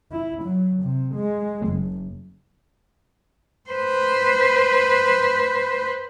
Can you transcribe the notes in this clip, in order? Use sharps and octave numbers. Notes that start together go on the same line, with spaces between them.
E4
F#3
C3
G#3
F#1
B4 C5